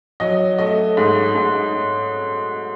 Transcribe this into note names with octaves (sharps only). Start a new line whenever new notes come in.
F#3 D#5
A3 D#5
G#2
G#2